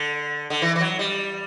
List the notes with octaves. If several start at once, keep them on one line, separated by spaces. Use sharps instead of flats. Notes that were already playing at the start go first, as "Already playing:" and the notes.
Already playing: D3
D3
E3
E3
F#3
G3